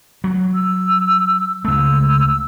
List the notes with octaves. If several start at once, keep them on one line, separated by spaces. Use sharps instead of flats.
F#3
E6
C#2 A3 E6